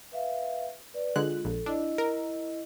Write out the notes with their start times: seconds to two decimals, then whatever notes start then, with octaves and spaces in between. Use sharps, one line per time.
0.12 B4 E5 F5
0.94 B4 D5
1.16 D3 G#3 F4 F#6
1.45 A#1 A4
1.66 D4 E4 D#5
1.98 A#4